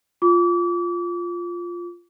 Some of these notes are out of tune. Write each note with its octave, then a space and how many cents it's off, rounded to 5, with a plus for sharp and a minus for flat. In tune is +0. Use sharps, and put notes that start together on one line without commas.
F4 +0 D6 -35